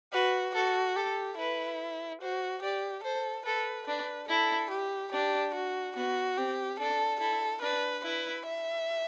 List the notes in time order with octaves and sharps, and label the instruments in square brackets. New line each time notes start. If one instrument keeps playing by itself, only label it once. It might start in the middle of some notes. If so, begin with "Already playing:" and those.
[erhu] F#4 [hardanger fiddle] B4
[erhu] F#4 [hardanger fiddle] A4
[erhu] G4 [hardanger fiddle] A4
[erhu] E4 [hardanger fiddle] B4
[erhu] F#4 [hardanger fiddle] C5
[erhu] G4 [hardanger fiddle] D5
[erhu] A4 [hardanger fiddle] C5
[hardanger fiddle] A4 [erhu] B4
[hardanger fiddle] D4 [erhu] B4
[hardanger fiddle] E4 [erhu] A4
[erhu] G4
[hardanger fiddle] D4 [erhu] G4
[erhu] F#4
[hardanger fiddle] B3 [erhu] F#4
[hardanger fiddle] C4 [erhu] G4
[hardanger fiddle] D4 [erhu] A4
[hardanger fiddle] E4 [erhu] A4
[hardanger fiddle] D4 [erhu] B4
[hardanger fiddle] E4 [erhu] B4
[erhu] E5